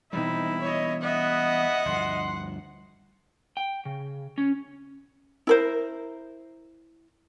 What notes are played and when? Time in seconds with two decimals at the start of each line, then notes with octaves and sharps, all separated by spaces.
0.13 B2 E3 G3 C4 D#4 E4
0.63 C#5 D#5
1.03 B3 D#5 E5 F#5
1.85 D2 G2 F3 C6
3.57 G5
3.85 C#3
4.38 C#4
5.47 E4 A#4 C5